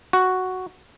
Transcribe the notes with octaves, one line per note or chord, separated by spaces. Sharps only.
F#4